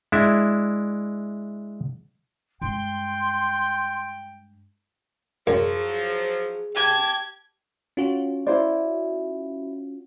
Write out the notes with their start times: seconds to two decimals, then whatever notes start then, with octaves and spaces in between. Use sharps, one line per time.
0.12 G#3 D4 E4 E5
2.62 G2 G#3 G5 C6
5.47 F#2 F3 F#3 G#4
6.76 G4 A5 G#6
7.97 C#4 F4 F#4
8.47 E4 C5 D5